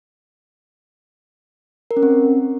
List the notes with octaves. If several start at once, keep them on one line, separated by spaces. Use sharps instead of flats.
A#4
C#4
C4